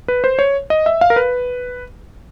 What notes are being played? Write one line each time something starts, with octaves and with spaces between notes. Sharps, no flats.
B4
C5
C#5
D#5
E5
F5
A#4
B4